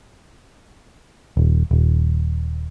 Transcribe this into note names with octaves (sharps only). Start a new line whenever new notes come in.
D#1
D#1